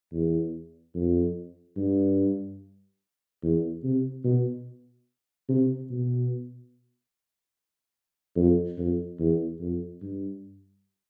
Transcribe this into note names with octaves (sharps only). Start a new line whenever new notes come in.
E2
F2
G2
E2
C3
B2
C3
B2
F2
F2
E2
F2
G2